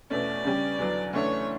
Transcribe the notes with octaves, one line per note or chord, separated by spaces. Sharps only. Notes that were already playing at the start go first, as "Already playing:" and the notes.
E2 B2 A3 C#4 D5
C#3 G3 C#4 G4
E2 D3 F#3 B3 D4
D2 C#3 E3 A3 D4 C#5